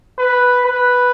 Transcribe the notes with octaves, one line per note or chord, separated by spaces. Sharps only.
B4
B4